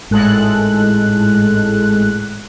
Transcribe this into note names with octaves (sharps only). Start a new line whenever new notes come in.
G#1 A2 G#3 A4 F#6